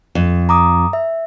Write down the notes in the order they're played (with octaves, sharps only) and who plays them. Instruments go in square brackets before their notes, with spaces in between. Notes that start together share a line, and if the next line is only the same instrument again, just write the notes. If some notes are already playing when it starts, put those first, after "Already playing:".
[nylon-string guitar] F2
[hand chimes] A#5 D6 D#6
E5